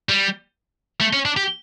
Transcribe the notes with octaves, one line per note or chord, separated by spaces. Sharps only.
G3
A3
C#4
D4
G4